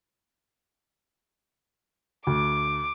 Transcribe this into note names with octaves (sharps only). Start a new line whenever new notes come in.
D2 D6